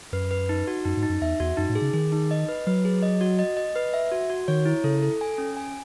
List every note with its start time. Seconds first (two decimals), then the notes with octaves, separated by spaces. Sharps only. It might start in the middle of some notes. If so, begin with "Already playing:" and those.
0.12 F#2 B4
0.31 B4
0.49 D#4
0.68 F#4
0.85 F#2 D#4
0.97 G#2
1.03 D#4
1.10 F#2
1.21 E2 E5
1.40 E2 F#4
1.57 F#2 D#4
1.69 A2
1.75 G#4
1.82 C#3
1.94 D#3 G#4
2.12 D#4
2.31 D#5
2.48 B4
2.67 F#3 B4
2.85 G#4
3.02 D#5
3.21 F#4
3.39 D#5
3.57 D#5
3.76 B4
3.94 E5
4.12 F#4
4.30 F#4
4.48 D#3 C#5
4.66 E4
4.84 C#3 A4
5.02 A4
5.21 G#5
5.38 C#4
5.57 G#5